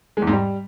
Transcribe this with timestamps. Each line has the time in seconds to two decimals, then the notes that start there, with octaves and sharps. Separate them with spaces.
0.17 G#3
0.22 E2
0.27 G#2
0.32 G3